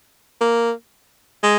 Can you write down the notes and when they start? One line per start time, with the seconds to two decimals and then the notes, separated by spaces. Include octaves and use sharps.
0.41 A#3
1.43 G#3